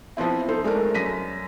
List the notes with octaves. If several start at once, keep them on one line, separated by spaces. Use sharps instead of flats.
F3 B3 C4 E4
D#4 A4 C5
G#3 A3 D4 A#4
F#2 A#6 B6 D#7